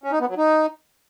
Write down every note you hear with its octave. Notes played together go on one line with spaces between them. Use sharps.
C#4
D#4
B3
F#3
D#4